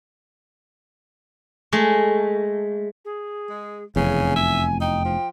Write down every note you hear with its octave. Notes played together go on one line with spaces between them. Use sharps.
G#3 A3
G#4
G#3
F1 E2 C#3 G#5
E5
D#4 G5
F3